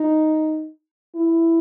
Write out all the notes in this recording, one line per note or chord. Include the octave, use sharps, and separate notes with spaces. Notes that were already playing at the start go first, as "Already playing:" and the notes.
Already playing: D#4
E4